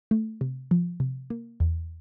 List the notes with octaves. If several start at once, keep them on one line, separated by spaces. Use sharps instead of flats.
A3
C3
F3
C3
A#3
E2